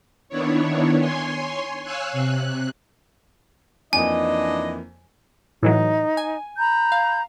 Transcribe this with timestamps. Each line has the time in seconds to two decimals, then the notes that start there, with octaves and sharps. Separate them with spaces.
0.29 D#3 B3 D4 E4 C#5
0.99 C#5 G#5 C6
1.83 C#5 F5 G#5 E6 F#6
2.12 C3 F#6
3.93 F2 E3 A#3 D4 D#4 D#5 G#5
5.63 A2 E3 F#3 D#4
6.17 G#5
6.58 A#5 B5 G6
6.92 F5